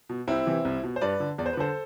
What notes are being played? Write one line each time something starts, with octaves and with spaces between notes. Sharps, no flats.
B2
C2 C4 E4
C3 E3
C2
B2
C5
G2 B4 D5
D3
E2 D5
C5
B4
D3 A4 C5